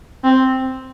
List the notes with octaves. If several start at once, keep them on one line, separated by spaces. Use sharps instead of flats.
C4